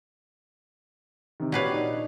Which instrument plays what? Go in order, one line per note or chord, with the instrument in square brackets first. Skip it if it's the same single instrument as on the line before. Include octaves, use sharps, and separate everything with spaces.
[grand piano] C3 D#3
[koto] A#2 B4 F5 [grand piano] F#4 G4 C#5
[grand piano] D4 D#4